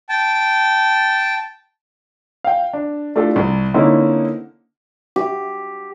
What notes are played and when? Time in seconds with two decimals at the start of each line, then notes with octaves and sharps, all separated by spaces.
0.09 G5 A5
2.44 F5 G5
2.73 D4
3.16 A3 D4 E4 F4 G4 A4
3.36 C2 C4
3.74 D3 A#3 C4 C#4 D#4 E4
5.16 G4